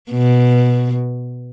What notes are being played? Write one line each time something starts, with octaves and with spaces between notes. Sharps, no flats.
B2